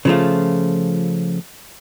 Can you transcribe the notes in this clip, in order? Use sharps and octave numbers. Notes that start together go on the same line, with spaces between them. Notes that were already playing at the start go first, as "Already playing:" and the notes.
C#3 F3 A3 F4